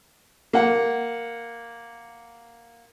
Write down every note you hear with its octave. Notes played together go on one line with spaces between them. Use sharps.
A#3 F#5